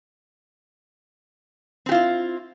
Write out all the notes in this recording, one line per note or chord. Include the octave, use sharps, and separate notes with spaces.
C4 E4 F4 G4